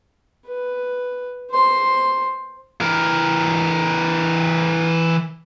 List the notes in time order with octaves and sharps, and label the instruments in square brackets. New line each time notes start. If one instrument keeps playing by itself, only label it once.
[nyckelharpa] B4
C5 C6
[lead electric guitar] E3 A#4